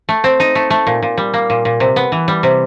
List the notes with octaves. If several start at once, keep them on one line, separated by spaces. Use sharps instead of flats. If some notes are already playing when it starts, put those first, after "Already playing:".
A3
C4
D#4
A3
A3
A#2
A#2
G3
A#3
A#2
A#2
C3
B3
E3
G3
C3